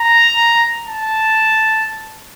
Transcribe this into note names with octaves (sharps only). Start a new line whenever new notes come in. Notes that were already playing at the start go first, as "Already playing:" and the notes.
Already playing: A#5
A5